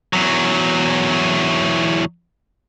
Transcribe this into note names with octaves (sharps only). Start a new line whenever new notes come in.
E2 F#3